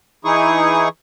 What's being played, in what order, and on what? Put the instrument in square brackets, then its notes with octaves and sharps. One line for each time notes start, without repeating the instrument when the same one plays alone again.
[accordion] E3 D#4 E4 G#4 C#6 D#6